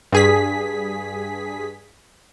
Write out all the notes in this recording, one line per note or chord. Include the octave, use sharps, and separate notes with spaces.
G2 G#4 B6